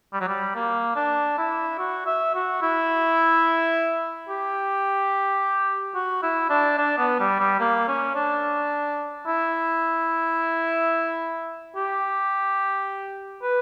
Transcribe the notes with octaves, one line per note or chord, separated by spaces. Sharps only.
G3
F#3
G3
A#3
D4
E4
F#4
E5
F#4
E4
G4
F#4
E4
D4
D4
B3
G3
G3
A#3
C#4
D4
E4
G4
B4